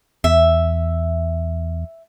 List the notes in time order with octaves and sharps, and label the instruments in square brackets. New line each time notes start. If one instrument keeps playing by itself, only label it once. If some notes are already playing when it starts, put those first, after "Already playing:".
[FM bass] E2 [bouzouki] E5